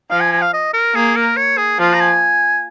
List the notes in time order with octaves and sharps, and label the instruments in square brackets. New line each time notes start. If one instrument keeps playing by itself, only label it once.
[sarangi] F3 [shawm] F5
[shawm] G#5
G#5
F5
D#5
A#4
[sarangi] A#3 [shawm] G#4
[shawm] A#4
C#5
G#4
[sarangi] F3 [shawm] F4
[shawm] A#5
G#5